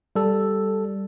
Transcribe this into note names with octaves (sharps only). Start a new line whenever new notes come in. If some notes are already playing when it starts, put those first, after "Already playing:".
G3 A4